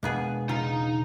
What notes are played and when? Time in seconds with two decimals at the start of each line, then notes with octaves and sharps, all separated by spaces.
0.03 E1 G#3 A#3 B3 D4 G#4
0.49 C#3 D#4 F4 F5 A#5